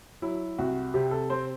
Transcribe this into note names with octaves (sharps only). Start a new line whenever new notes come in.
F#3 E4
C2 F#4
C3 G4
A4
C4 C5